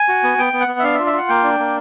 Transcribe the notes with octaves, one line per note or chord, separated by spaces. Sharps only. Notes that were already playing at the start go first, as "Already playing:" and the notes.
Already playing: G#5
F#4
B3
B3 G5
B3
F#5
B3
E5
D4 F5
E5
F4
E5
F4 F#5
A#3 G5
D4
A#3